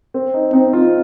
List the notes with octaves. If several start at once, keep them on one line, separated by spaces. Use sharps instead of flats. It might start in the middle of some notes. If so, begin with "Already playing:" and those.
C4
D#4
C4 D#4
F4